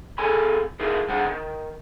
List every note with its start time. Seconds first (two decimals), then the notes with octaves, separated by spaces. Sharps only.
0.18 C3 G#4 A4 G#5 B5
0.80 D3 D#4 E4 G#4 A#4
1.08 G3 D4 G#4 C5 F#5
1.25 D#3